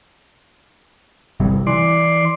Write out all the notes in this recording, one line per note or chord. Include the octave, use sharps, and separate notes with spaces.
G1 C3 G3
E3 D5 C6